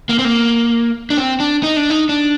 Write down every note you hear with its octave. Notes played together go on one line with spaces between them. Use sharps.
A#3
C4
A#3
D4
C4
D4
D#4
D4
D#4
D4